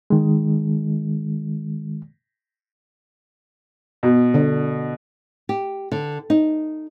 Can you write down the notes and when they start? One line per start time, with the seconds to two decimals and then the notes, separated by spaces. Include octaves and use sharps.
0.10 D#3 G#3
4.03 B2
4.34 D3
5.49 G4
5.92 D3
6.30 D#4